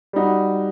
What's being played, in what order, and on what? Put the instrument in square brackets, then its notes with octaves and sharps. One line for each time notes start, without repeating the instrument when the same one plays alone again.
[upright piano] G3 D#4 F#4